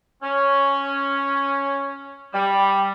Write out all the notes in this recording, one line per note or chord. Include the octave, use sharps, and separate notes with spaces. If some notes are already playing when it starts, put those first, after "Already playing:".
C#4
G3